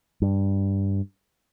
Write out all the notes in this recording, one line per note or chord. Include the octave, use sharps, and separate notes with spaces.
G2